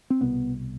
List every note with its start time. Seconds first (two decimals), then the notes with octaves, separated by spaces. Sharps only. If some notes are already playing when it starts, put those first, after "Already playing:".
0.10 C4
0.21 C2 B2 B3